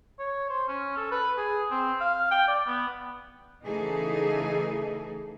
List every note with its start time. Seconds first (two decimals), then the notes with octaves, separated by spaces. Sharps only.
0.19 C#5
0.50 C5
0.68 C#4
0.97 A4
1.11 B4
1.37 G#4
1.71 C4
2.00 F5
2.31 G5
2.48 D5
2.67 B3
3.64 C#3 E3 A3 D#4 G#4 A4